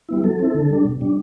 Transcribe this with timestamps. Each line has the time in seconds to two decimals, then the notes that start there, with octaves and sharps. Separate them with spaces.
0.09 G3 B3 E4
0.24 F#3 A4
0.39 C4 E4
0.54 D3
0.70 G3 D4
0.85 B2
1.00 G3 D4